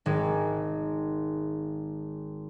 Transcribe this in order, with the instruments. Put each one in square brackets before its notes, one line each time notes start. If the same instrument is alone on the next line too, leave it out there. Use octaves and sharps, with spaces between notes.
[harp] G#1 G#3